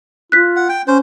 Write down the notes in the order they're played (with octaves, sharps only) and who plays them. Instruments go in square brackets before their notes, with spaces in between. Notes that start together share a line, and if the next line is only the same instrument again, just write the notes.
[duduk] F4 [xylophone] F#6 B6
[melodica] F#5
G5
[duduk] C#4 [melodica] C5